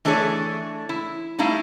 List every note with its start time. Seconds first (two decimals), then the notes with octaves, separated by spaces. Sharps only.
0.05 E3 A3 D4 G#4 B4 C#5
0.89 E4
1.39 G3 A3 D#4 E4 F5